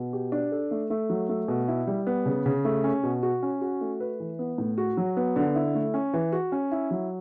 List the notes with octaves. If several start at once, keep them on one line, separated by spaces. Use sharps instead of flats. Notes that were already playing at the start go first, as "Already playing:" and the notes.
Already playing: B2
G4
D4
A4
A3
A3
F#3
A3
B2
E4
G3
B3
C#3
C#3
A3
C#4
B2
F#4
C#4
F#4
A3
B4
E3
B3
A2
F#4
F#3
B3
D3
E4
A3
C#4
E3
F#4
C#4
E4
F#3